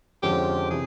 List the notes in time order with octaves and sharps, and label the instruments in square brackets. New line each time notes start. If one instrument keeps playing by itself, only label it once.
[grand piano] F2 D3 F3 G#3 C#4 [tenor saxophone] G4
[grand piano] C3 E3 [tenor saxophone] G#4